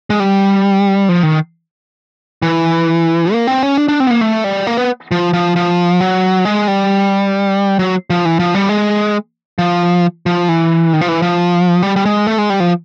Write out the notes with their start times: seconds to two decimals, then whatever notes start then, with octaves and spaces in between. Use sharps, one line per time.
0.10 G#3
0.20 G3
1.09 F3
1.23 D#3
2.42 E3
3.33 A#3
3.47 C4
3.63 C#4
3.78 D4
3.88 D4
4.00 C4
4.07 B3
4.11 A#3
4.21 A3
4.44 G3
4.67 A#3
4.77 B3
5.11 F3
5.33 F3
5.56 F3
6.00 F#3
6.45 G#3
6.68 G3
7.79 F#3
8.10 F3
8.25 E3
8.39 F3
8.54 G3
8.69 G#3
9.59 F3
10.26 F3
10.48 E3
10.93 D#3
11.01 F3
11.08 E3
11.22 F3
11.83 G3
11.96 G3
12.05 G#3
12.27 A3
12.38 G#3
12.50 G3
12.60 F3